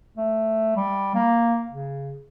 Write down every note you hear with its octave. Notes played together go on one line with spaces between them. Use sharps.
A3
G3
A#3
C#3